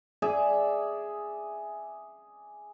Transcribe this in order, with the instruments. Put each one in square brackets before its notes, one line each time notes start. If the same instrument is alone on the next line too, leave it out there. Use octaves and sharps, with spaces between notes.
[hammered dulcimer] G#4 D5 E5